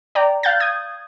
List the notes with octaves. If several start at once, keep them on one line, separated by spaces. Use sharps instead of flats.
D5 G5 A#5
F5 F#6 G6 A6
D#6 G#6